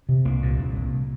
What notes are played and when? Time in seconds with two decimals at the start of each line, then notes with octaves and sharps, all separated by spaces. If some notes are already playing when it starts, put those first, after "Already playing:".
0.09 C3
0.25 C2 A#3
0.43 A#2
0.59 C2
0.76 C2